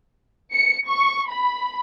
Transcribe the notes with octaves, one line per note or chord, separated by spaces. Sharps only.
C#7
C#6
B5